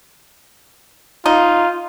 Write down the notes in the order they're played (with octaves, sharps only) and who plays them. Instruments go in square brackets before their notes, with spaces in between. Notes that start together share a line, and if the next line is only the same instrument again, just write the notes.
[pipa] D#4 [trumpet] F4